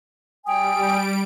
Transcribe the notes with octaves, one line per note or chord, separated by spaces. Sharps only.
G3 G5 G#5 D#6 D7